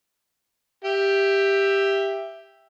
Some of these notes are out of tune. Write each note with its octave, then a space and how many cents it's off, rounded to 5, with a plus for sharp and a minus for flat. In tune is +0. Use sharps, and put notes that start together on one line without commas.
G4 +10 E5 +5